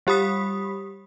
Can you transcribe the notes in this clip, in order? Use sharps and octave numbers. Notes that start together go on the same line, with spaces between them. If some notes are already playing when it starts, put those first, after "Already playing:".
G3 G4 B5 D#6 B6